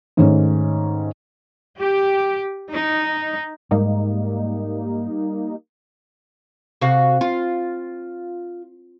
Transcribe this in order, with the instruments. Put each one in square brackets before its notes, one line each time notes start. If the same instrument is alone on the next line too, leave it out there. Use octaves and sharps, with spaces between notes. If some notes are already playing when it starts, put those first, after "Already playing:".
[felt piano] G#2 D#3 A3 C#4
[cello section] G4
D#4
[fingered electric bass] G#2 [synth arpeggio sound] G3 A#3 D#4
[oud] C3 F#4 F5
F4